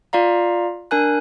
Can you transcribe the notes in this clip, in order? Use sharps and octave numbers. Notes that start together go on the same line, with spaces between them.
F4 D5 F5 A#5
D4 A#4 G#5 F#6